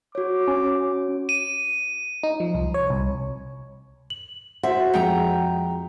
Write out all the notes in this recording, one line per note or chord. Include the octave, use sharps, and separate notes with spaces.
F#4 C#5 D6
C#4
D#7
D#4
F3
C2
C#5
C2
F#7
F#4 C5 E5 F#5
F2 G#3 D#4 G5 A#5